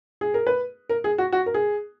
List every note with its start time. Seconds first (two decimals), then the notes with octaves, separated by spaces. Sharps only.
0.21 G#4
0.34 A#4
0.47 B4
0.89 A#4
1.04 G#4
1.18 F#4
1.32 F#4
1.46 A#4
1.54 G#4